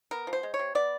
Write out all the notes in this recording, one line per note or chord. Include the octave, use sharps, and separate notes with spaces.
B3 A#4
F3
C5
G#3
C#5
C3
B3 D5